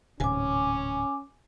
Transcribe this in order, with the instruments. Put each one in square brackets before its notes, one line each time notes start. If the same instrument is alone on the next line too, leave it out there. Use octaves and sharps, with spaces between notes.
[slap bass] D1 G#2 C3 [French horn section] C#4 [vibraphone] G#5 D6